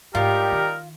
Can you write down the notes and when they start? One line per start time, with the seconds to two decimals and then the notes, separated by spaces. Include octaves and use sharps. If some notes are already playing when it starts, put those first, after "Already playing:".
0.15 G#2 G3 D#4 F4 G4 A#4
0.52 D#3